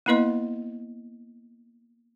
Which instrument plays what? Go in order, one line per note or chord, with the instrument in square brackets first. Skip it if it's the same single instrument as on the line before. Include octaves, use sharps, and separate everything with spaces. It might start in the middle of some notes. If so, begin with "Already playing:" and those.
[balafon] A#3 B3 E4 B4 D#5 C6